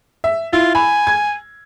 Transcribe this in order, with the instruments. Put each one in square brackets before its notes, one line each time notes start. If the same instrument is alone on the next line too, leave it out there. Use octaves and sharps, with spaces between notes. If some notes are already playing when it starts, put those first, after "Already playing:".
[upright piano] E5
[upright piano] E4 [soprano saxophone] F4
[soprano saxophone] G#5 [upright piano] B5
[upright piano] G#6